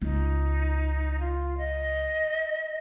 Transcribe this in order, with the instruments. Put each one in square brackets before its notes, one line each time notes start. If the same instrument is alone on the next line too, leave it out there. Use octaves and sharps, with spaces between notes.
[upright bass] C#2 [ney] D#4
[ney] F4
D#5